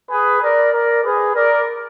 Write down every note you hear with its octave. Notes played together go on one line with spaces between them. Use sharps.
G#4 B4
A#4 D5
A#4 D5
G#4 B4
A#4 D5